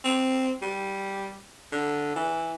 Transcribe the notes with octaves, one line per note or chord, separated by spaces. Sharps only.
C4
G3
D3
E3